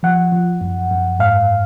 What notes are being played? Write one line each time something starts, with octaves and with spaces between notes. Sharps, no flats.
F3 F#5
F3
F#2
F#2
G#2 F5